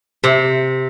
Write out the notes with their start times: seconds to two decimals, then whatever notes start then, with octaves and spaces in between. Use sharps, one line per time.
0.24 C3